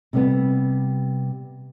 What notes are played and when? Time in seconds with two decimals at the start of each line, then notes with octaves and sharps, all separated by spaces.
0.13 C3 G3 B3